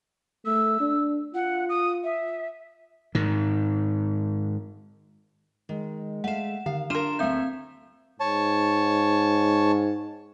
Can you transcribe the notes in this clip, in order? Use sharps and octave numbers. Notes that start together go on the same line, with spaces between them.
A3 E6
D4
F4 F#5
D#6
E5
G#2 D#3
D#3 G#3
A3 F5 F#5 E7
D3 D#3 F5
D4 F4 A#4 C6 E7
D2 A3 C4 E5 G6
G#2 C#5 A5